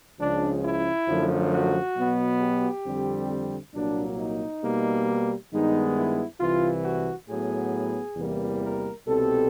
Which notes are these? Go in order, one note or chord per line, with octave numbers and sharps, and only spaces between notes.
C#2 C#3 F3 D4
E4
F#2 D3 F3 A3
F#4
B2 F#3 B3
G4
F2 D3 G3 C4
C2 A#2 F#3 A#3 D4
D#4
B2 G3 A#3
G2 D#3 G#3 B3 D#4
E4
C2 C3 E3 F4
F#4
A2 F#3 B3 G#4
E2 C3 E3 G3 A#3
A#4
C2 B2 G3 C4 A4